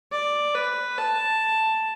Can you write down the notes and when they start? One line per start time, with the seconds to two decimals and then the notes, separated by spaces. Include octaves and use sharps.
0.12 D5
0.55 B4
0.98 A5